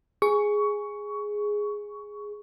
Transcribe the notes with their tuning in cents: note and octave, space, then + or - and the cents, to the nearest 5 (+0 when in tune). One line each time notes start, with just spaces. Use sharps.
G#4 +0 C#6 +15